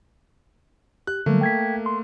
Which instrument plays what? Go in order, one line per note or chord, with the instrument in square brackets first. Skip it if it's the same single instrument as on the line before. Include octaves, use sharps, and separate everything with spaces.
[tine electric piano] G4 [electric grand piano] F#6
[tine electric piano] D3 F#3 G3 [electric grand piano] A3 A#3
[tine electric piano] G5 G#6 B6
C6